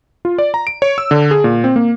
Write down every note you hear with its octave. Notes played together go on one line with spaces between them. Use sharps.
F4
D5
A#5
D7
C#5
E6
D3
G#4
A#2
C4
A#3